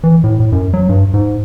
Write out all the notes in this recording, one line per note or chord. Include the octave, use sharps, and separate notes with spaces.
E3
A2
A2
F#2
F#3
G2
G#2